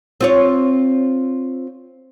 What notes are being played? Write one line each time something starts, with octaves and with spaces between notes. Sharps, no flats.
C4 F4 C#5